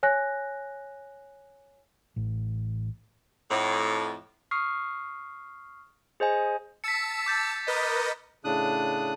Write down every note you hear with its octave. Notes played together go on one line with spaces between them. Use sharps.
C#5 G#5 F#6 A#6
A1
F2 A2
C#6 D#6 F6 C7
G#4 C5 D#5 G#5
A5 E6 B6 C#7
D6 G6 A6
A#4 B4 D#5
A2 C#3 D4 D#6 F#6